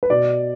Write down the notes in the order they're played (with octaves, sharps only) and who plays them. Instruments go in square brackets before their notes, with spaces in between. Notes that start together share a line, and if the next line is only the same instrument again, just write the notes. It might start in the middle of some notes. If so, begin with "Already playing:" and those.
[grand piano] B4
B2 D5